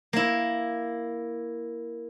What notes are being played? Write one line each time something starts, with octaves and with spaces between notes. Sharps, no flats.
A#3 E4